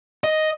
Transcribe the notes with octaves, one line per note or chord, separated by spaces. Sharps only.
D#5